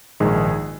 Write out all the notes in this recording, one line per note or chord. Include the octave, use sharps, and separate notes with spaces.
A#1 G#2 D#3 G#3 G#4